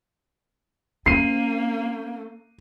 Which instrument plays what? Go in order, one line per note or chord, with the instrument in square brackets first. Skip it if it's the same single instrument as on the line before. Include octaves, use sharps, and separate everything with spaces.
[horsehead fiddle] A#3 [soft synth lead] C4 [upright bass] C#4 [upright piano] C7 D#7